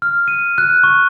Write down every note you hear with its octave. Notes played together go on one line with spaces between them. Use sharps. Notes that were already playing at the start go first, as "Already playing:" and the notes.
F6
D#7
F#6
C#6